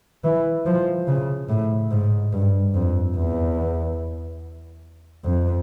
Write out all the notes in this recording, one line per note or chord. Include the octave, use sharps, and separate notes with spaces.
E3
F3
C#3
A2
G#2
G2
F2
E2
F2